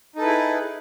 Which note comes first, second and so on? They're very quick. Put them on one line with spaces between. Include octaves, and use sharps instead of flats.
D#4 A4 B4 E4 G#4